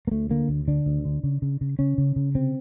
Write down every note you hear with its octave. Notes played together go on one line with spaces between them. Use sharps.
A#3
D2 A3
D3 A#3
D2
D3 D4
D2
D3
C#3
C#3
C#3
C#3 C#4
C#3
C#3
C3 C4